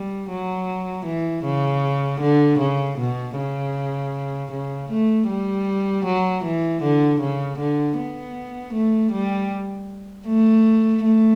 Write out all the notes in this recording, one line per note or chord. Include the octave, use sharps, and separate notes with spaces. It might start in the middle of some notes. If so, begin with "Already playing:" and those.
Already playing: G3
F#3
E3
C#3
D3
C#3
B2
C#3
C#3
A3
G3
F#3
E3
D3
C#3
D3
B3
A3
G3
A3
A3